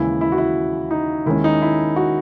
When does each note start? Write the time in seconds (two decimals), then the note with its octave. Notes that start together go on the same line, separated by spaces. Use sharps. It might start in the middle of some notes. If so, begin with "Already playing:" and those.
Already playing: D#2 C#3 E3 G#3 C#4 E4
0.21 E4
0.32 F#4
0.38 E4
0.91 D#4
1.26 D#2 D#3 G#3 C#4 E4
1.44 D#4
1.62 E4
1.96 F#4